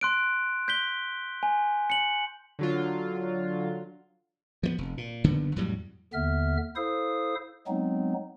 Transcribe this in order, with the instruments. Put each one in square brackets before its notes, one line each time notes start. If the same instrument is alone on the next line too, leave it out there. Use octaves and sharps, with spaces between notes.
[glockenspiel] C6 F#6 D7
G6 B6 G7
G#5
C#7 F#7
[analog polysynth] D3 F#3 F4
[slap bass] F3 G3 B3
F1
A#2
F#1 D3 D#3 B3
F2 A2 F#3 G3
[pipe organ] D#2 D3 B3 E5 F6
E4 A4 C5 F5 D#6
F#3 G#3 B3 C4 D#4